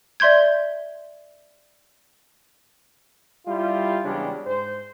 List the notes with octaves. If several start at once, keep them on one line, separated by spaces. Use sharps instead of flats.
D5 E5 C6 G6 G#6
G3 E4 F4
E2 C#3 G3 G#3 D4
G#2 C5